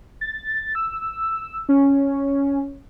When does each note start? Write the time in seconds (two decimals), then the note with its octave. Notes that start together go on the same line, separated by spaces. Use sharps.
0.21 A6
0.75 E6
1.69 C#4